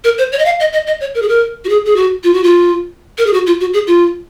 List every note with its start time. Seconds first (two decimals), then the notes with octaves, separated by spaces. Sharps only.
0.04 A#4
0.18 C5
0.32 C#5
0.39 D#5
0.45 F5
0.60 D#5
0.73 D#5
0.87 D#5
1.01 C#5
1.15 A#4
1.22 G#4
1.29 A#4
1.65 F#4
1.69 G#4
1.86 G#4
1.96 F#4
2.24 F4
2.34 F#4
2.44 F4
3.18 A#4
3.26 G#4
3.33 F#4
3.46 F4
3.61 F#4
3.74 G#4
3.87 F4